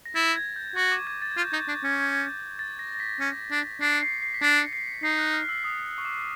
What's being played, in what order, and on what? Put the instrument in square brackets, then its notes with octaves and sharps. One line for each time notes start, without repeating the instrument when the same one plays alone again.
[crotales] A#6
[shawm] E4 [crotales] A6
[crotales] G#6
G6
[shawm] F#4 [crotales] C#6
[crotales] D6
G#6
A6
G#6
[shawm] F4
[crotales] G6
[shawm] D#4 [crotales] G#6
[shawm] D4
C#4
[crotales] A6
A#6
A#6
B6
[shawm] C#4
D4
[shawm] D4 [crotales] C7
[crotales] C#7
C7
C7
B6
[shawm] D4 [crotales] C7
[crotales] C#7
C7
C#7
[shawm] D#4 [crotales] C7
[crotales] F#6
F6
E6
D#6
C#6
D6